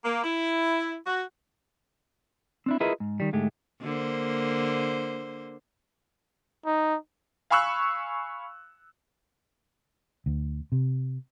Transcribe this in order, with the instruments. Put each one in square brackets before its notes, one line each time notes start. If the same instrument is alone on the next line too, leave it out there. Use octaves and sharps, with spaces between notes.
[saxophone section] A#3
E4
F#4
[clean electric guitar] C4 D4 E4
E4 F4 G#4 A#4 B4 D#5
G#2
D#3 G3
D2 G#2 G#3 A3 G4
[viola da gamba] D3 A#3 C5
[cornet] D#4
[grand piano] F5 G#5 B5 C#6 E6 F#6
[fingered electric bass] D2
C3